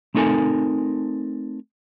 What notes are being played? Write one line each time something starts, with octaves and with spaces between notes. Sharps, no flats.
A3 C4 D#4 A4 A#4 G#5